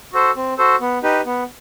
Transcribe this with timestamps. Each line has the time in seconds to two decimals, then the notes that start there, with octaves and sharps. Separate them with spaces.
0.13 F#4 A4 C5
0.36 C4
0.58 F#4 A4 C5
0.81 B3
1.03 D#4 G4 B4
1.26 B3